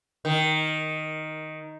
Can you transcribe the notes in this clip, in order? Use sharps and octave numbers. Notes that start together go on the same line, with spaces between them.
D#3